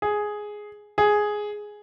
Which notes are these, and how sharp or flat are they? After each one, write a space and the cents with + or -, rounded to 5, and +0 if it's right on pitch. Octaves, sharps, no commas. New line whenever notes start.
G#4 +5
G#4 +5